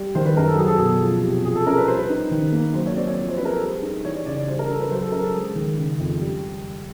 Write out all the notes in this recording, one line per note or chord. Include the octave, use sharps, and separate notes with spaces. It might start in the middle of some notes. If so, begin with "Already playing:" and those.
Already playing: G3
D#3 C5
B4
F#2 A#4
A4
F#3 G#4
A4
B2 G#4
F3
C3
F3 G#4
A4
C#4 A#4
B4
G3 C5
B4
D#4
D#3
A#3
F#3 C5
C#5
C4 D5
C#5
F3
C5
C#4 B4
A#4
A4
G3 G#4
D#4
E3 C#5
D5
C#3 D5
D5
G3 C5
A#4
D4 A4
B4
F#3 C5
A4
C#4 A#4
A4
G#3 G#4
D#3
C#3
F2
G3